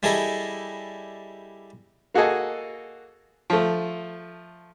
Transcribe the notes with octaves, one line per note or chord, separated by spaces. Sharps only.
G3 E4 G#4 A4 D#5
A#3 F#4 G#4 A4 D#5 G#5
F3 A3